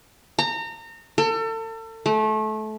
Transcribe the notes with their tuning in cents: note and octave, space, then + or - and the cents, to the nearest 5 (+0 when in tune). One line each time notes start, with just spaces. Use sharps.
A#5 -30
A4 +35
A3 -25